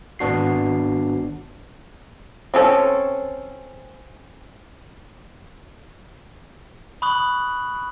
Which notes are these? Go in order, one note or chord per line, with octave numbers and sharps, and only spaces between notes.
G#1 B3 D4 F#4 C7
C4 C#4 A4
B5 C#6 D#6 F#6 F#7